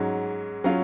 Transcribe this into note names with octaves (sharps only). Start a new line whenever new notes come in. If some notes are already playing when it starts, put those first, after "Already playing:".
Already playing: G#2 F#3 C#4 F#4
F#3 C#4 F4